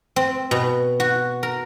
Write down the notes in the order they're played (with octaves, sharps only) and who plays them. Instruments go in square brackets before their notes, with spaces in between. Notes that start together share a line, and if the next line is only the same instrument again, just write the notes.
[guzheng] C4
B2
F#4
A#4